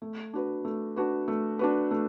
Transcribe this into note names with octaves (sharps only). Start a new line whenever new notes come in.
A3
D4 F#4 B4
A3
D4 F#4 B4
A3
D4 F#4 B4
A3